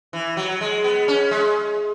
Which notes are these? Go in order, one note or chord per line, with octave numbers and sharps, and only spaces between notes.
E3
F#3
G#3
B3
C#4
G#3